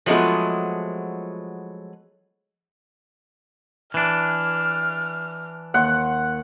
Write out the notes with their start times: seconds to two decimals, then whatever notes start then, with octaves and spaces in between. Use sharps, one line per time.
0.06 F3 F#3 G#3 A3 B3 F4
3.94 E3 D4 F6
5.74 D#2 F#5 C6 F#6